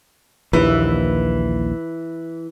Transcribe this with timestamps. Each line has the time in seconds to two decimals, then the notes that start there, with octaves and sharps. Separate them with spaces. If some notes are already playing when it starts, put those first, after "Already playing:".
0.53 A#1 D#2 E3